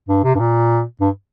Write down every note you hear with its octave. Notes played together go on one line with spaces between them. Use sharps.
G2
C3
G2
A#2
G2